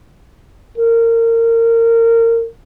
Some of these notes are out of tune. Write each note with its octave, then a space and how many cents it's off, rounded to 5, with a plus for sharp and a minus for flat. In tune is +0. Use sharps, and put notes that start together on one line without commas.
A#4 -25